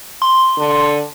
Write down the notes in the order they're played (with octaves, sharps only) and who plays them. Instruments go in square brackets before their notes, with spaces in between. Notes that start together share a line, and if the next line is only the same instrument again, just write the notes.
[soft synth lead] C6
[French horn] D3